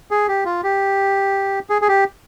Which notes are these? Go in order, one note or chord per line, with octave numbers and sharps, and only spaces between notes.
G#4
G4
F4
G4
G#4
G#4
G4